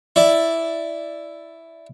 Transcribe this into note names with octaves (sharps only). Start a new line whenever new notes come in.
E4 D5